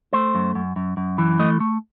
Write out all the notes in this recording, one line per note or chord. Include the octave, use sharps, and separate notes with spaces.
A3 C5
F#2
F#2
F#2
F#2
E3
A3 D#5
A3